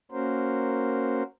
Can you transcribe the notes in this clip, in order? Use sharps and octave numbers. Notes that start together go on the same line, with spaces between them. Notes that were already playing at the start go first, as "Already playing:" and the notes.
A#3 C#4 F#4 A#4 C5